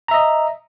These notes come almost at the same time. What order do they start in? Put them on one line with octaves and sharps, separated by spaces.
A#5 E5 D#5